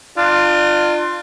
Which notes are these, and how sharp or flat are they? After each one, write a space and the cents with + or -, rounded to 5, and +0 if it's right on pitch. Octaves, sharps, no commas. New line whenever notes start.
D4 +35 F4 +0